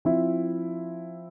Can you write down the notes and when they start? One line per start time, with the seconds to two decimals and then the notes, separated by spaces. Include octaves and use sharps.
0.05 F3 C4 E4